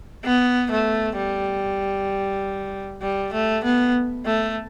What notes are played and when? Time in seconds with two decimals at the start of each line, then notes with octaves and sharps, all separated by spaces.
0.25 B3
0.71 A3
1.17 G3
3.02 G3
3.33 A3
3.64 B3
4.26 A3